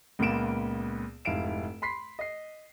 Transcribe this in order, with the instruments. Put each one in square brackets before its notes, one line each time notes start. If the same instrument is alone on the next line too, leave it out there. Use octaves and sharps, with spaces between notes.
[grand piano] C#2 A#2 A#3 B3 D7 E7
F1 G#2 E4 F5 D7 E7
B5 C6 B6 C7
D#5 C7